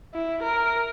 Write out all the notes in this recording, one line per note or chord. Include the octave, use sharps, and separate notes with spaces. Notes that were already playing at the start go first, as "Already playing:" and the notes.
E4
A#4